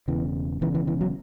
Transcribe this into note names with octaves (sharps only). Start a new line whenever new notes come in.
E1 E2 C#3 E3
E1 E2 C#3 E3
E3
E3
F#3